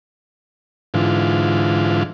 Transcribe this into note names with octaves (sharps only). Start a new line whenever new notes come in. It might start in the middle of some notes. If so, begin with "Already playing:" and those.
G#2 D3 E3 F4